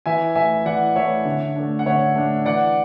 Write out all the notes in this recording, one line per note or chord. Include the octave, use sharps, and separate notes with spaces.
E3 E5 G#5
A3 E4 E5 G#5
E3 D5 F#5
A3 E4 C#5 E5
D3
A3 D4
F#5
D3 C#5 E5
A3 D4
E3 D5 F#5